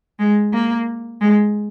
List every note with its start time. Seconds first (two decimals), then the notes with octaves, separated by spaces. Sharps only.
0.19 G#3
0.53 A#3
1.21 G#3